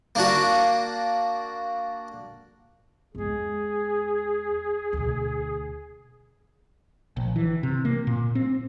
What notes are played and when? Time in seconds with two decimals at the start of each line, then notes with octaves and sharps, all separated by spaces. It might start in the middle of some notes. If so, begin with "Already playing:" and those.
0.15 A#3 D4 F#4
3.15 E2 G#3 G#4
4.93 D2 B2
7.17 A#1
7.36 E3
7.63 C3
7.85 A#3
8.07 A#2
8.35 C4